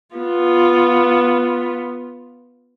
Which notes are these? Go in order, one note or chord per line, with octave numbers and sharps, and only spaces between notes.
B3 F4